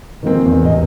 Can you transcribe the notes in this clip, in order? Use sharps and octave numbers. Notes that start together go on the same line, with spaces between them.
D#3 F3 G#3 A#3 C4
E2
A1 D#5